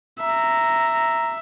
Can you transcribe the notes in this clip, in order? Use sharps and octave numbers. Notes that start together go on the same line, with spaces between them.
E5 A#5